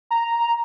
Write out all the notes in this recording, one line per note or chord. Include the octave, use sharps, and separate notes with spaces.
A#5